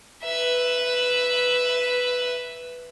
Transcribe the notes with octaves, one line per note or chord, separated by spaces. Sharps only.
B4 E5